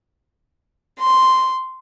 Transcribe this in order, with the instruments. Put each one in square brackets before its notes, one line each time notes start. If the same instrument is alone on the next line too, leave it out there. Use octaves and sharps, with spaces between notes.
[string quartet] C6